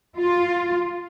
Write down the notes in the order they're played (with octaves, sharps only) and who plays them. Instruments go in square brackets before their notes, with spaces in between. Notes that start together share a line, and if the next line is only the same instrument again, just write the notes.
[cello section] F4